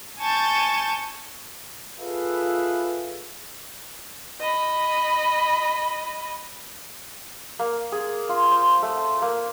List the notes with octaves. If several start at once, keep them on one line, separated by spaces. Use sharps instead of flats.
G#5 A5 C#6 G6 A6
F4 G#4 A4 B4 E5 F5
D#5 B5
A#3
G#4
F4
C5
A3
A5
A#3